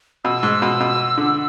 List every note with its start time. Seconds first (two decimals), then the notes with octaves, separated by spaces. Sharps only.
0.25 B2 E6
0.43 G#2
0.62 B2
0.80 B2
1.18 D3